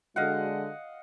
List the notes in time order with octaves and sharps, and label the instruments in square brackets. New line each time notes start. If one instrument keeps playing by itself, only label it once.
[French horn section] D3 G#3 F#4 [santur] D#5 F5 F#5